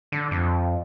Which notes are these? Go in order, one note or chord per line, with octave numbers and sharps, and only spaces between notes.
D3
F2